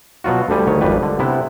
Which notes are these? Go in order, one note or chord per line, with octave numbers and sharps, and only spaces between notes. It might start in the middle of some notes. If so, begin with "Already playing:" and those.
B2 F#3 F4 F#4
D2 D3 G3 G#5
D2 D#3 C#5
G#1 F2 G3 B4
D3
C3 B3 E4